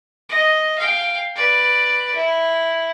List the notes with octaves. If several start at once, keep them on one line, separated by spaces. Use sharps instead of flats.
D#5
F5 G5
B4 D5
E4